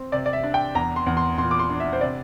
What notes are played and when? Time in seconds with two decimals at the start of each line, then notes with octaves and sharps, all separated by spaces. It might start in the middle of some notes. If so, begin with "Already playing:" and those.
Already playing: C4
0.12 C3 D5
0.26 D5
0.33 E5
0.44 D4
0.54 G5
0.75 E2 A#5
0.96 C6
1.06 E2
1.17 C6
1.38 A#2 C6
1.51 D6
1.59 C6
1.70 D4
1.80 E5
1.93 C5
2.01 C3 D5